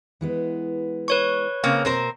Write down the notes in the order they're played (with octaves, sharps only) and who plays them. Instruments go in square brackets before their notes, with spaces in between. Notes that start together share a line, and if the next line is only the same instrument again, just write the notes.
[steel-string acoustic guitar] E3 G#3 B3
[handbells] B4 C#5 C#6
[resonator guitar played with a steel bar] C#3 A#3 C4
[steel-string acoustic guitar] B2 A#3 [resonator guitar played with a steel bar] C4 A#4 C5